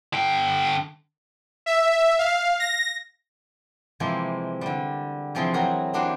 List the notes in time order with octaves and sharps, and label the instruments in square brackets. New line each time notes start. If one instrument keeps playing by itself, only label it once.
[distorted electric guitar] D3 G5
[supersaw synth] E5
F5
A#6
[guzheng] C3 E3 F3 G#3 A#3 C4
D3 G3
C3 E3 F3 C4 F4 G#4
E3 F#3 C4 F#4 A#4 A#5
E3 A#3 D4 F#4 G4 C5